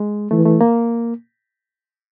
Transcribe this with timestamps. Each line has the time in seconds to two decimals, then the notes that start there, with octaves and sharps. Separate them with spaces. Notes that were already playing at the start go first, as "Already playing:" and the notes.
Already playing: G#3
0.31 E3 A3
0.46 A3
0.61 A#3